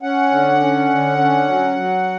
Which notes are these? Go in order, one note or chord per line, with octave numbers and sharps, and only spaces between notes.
C#4 F#5
D3
C#4
D3
C#4
F#3
F#3